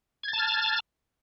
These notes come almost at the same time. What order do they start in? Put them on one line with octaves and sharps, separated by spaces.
G#6 A6 A5 F6